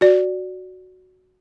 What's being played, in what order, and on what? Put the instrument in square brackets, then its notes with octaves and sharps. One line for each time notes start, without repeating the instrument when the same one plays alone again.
[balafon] F#4 D5